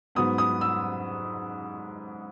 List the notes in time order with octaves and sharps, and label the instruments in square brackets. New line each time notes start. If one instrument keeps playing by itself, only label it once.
[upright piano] G#2 F#3 B3 D#6
D#6
E6